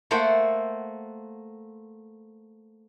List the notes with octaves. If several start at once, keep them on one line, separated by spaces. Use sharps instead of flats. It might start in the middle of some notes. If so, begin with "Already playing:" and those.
A3 A#3 A4 C5 F#5